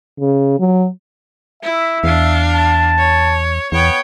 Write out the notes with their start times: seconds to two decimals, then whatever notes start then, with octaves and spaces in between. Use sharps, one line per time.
0.20 C#3
0.59 F#3
1.63 E4 E5
2.04 E2 D4 F5
2.54 A5
2.98 C#5
3.72 E2 B3 C#5 G5